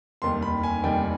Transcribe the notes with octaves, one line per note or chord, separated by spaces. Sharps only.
F1 D#2 D#3 G3 C6
B5
G#5
F1 D#2 D#3 G3 G5